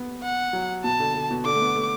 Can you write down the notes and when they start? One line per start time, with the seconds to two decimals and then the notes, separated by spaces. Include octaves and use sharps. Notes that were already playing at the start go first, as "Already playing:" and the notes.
Already playing: B3
0.23 F#5
0.53 F#3
0.84 B2 A5
1.00 D3
1.14 D3
1.31 B2
1.45 D3 D6
1.55 A3
1.61 B3
1.76 A3